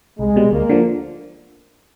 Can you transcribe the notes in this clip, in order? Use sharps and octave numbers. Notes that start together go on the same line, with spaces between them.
C2 G#3
B2 G3
D2 A#3
D3 F3